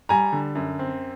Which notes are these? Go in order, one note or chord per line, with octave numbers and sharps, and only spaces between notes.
G3 G#5 A#5
D3
F#2
C4